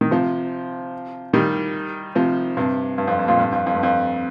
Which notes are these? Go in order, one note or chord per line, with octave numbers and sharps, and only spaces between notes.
D#3
C3 F3
D#3 G3
C3 F3
G2 C3
G2
F2
G2
F2 A#2
G2
F2
F2
G2
F2